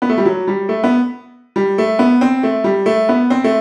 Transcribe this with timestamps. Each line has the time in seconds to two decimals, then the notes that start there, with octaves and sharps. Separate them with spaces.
0.02 B3
0.09 A3
0.18 G3
0.26 F#3
0.47 G3
0.69 A3
0.84 B3
1.56 G3
1.78 A3
1.99 B3
2.21 C4
2.43 A3
2.64 G3
2.86 A3
3.09 B3
3.30 C4
3.44 A3